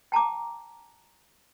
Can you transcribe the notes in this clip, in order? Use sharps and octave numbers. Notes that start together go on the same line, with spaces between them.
G5 A5 A#5 D6